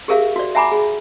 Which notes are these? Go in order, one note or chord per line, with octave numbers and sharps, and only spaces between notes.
G4 G#4 A#4 E5 F5
F#4 D5
E5 F#5 G#5 A#5 B5 D6
G#4